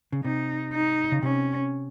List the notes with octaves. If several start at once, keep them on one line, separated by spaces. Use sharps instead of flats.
C#3
C3 D#4
D#4
C#3
C3 C#4